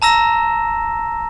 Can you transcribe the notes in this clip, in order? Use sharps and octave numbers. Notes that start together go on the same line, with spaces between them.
A5 A#5 E6 A#6 E7